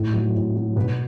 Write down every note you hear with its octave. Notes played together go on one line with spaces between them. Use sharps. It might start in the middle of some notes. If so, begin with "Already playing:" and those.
Already playing: A2
F#3
A2
F#3
B2 B4